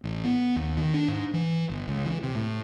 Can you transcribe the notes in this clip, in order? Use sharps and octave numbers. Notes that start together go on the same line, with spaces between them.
A1
B3
D#2
D#3
D4
G#2
E3
G1
C#2
E3
C3
A2